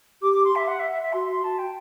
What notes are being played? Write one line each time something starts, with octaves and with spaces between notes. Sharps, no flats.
G4 D6
D6
C6
E5
F#5
E5
E5
E5
F#4 C6
C6
A5
G5